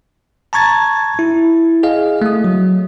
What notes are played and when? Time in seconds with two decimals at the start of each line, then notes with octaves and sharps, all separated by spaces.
0.53 A5 A#5 C#6 G#6 A6
1.19 E4
1.83 G#4 D#5 F5
2.22 A3 D#6
2.44 F#3